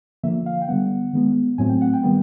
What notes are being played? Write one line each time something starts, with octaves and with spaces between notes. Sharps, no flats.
D3 F3 A#3 E5
F5
G5
D3 G3 B3 F#5
D#3 G#3 B3
A2 F#3 A3 C4 G#5
G5
F#5
G5
D#3 G3 B3